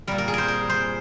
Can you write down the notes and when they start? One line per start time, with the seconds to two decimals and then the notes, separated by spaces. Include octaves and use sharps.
0.07 A#2 G3 A#4
0.18 A#4
0.28 G#4
0.34 A#4 C5
0.48 A#4
0.69 C5